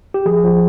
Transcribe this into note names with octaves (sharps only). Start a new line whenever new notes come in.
G4
F3 G#4
F3